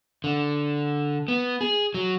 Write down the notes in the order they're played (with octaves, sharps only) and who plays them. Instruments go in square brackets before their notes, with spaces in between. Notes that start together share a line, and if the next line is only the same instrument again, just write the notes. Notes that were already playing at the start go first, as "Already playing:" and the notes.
[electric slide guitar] D3
B3
G#4
F#3